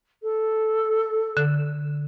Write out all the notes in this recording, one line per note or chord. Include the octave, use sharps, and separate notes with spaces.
A4
D3